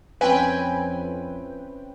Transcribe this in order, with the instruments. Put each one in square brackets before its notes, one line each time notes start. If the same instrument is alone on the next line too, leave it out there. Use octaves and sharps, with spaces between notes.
[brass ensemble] F2 [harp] C4 C#4 E4 [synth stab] B4 G5 [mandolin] G#5